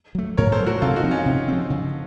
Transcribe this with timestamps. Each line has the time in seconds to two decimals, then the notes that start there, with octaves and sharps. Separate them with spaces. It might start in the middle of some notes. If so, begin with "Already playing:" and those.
0.15 F#3 A3
0.37 A2 A#4 C#5
0.52 A4 C5
0.59 F#3
0.64 A3 F#4 A#4
0.82 C3 F4 A4
0.96 D#4 F#4
1.04 F3 C4
1.11 C#4 F4
1.26 C3
1.48 F3 C4
1.70 C#3